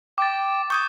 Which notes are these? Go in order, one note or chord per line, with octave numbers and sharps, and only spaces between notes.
G5 D6 A6
C#6 D#6 G6 G#6